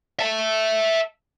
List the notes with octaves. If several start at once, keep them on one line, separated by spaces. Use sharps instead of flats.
E5 A5